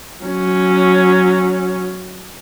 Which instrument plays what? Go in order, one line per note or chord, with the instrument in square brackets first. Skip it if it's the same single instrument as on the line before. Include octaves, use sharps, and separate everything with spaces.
[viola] F#3 C#4